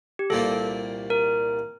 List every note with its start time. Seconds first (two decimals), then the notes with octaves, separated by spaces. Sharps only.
0.19 G4
0.30 C2 A#2 G3 A#3 A4
1.10 A#4